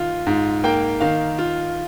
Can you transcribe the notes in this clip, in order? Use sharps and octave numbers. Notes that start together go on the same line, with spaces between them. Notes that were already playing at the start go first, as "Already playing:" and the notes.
Already playing: D#3 F4
G#2
A#3 G5
D#3 F5
F4